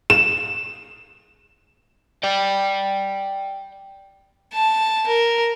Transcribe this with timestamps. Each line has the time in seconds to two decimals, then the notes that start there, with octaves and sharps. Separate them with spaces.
0.10 E7
2.23 D5 G5
4.53 A5
5.07 A#4